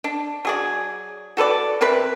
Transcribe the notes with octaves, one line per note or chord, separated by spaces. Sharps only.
D4
F#3 G#4 D5
F#4 A4 B4 D5
C3 C4 A#4 B4